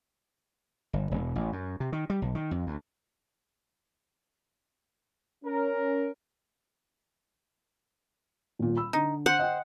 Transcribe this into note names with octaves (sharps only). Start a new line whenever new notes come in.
G1
E1
A1
F#2
C3
D#3
G3
B1
D#3
F2
D2
C#4 A#4
D#1 A#2
B5 E6
D3 D#4
C5 F#5
D#5 G5